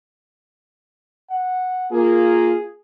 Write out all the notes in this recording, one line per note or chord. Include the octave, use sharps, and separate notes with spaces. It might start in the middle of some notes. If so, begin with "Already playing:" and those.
F#5
A#3 F4 G#4